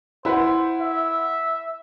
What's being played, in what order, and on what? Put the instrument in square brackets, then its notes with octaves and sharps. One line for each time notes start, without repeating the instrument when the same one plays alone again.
[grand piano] E4 B4 F#5 [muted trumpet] C5
[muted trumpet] E5